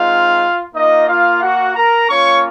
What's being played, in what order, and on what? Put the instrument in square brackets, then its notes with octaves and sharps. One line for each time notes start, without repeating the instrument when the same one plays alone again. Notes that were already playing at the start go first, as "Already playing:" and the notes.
Already playing: [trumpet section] G#3 C4 D#4 F4 F5
A#3 D#4 F4 D#5
F4 F5
F#4 F#5
A#4 A#5
A#3 C#4 F4 C#5 C#6